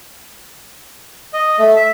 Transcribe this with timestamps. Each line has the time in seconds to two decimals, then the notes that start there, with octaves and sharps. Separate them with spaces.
1.33 D#5
1.59 A3
1.76 E5